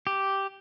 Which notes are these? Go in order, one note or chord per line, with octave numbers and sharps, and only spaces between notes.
G4